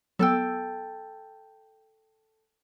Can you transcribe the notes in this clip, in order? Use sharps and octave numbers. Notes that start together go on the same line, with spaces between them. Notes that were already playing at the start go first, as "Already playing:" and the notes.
F#3 B3 A4 G5 E6